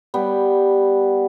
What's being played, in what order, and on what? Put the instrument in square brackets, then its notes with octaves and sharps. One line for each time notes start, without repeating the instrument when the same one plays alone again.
[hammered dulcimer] G3 B3